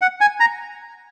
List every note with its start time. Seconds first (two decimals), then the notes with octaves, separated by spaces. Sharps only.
0.01 F#5
0.21 G#5
0.40 A#5